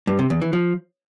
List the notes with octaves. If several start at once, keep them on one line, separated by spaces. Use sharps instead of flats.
G2
C3
E2
E3
F3